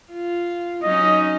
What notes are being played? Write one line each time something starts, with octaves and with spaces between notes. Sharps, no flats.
F4
F#3 C#4 D#4 D#5